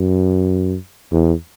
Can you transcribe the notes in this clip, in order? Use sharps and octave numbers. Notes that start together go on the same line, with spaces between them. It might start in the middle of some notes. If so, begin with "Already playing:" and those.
Already playing: F#2
E2